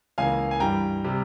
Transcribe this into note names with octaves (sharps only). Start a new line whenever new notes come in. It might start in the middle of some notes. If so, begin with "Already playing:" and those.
C#2 C#3 E3 A#3 F5 G#5
G#5
G2 E3 G3 G5 A#5
C3 G3